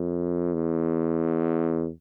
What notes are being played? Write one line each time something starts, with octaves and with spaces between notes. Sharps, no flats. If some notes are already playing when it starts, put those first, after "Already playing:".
Already playing: F2
E2